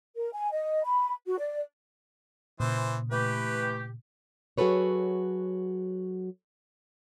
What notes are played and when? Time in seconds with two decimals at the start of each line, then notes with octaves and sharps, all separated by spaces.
0.16 A#4
0.34 G#5
0.52 D#5
0.84 B5
1.27 F#4
1.39 D5
2.60 A#2 C#3 E3 C5
3.11 E3 A3 G4 B4
4.58 F#3 F#4 G#4 A4 B4 C#5